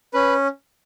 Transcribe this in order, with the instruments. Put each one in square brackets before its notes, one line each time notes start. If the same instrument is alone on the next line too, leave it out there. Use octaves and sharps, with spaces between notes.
[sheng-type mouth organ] C#4 B4